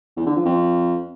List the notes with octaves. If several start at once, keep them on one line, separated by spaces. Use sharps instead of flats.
E2
D3
F3
F2